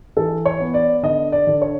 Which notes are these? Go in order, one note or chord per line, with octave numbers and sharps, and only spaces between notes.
E3 A4
C#5
B3
D5
D3 D#5
D5
D3
C#5